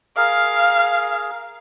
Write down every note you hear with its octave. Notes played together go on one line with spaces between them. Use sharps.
G#4 A#4 F5